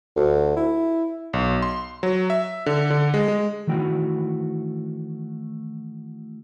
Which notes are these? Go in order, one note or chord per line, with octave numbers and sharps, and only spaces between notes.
D2
E4
B1
C6
F#3
E5
D3
D3
G#3
G#3
D#3 E3 A3 F#4 G5